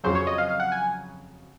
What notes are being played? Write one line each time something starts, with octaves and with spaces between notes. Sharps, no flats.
F2 C#3 F#3 C5
C#5
D#5
F5
F5
F#5
G#5